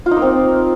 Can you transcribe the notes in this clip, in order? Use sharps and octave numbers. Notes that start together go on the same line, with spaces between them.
F4
D#4
A#3
C4